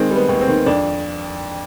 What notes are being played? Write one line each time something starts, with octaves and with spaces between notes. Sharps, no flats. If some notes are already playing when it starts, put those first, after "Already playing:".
Already playing: D#3 G#3 C4
G3
B3
D#2
C4
D#3
F2 D4